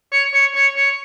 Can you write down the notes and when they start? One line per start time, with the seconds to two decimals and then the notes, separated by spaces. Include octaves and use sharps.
0.12 C#5
0.34 C#5
0.55 C#5
0.77 C#5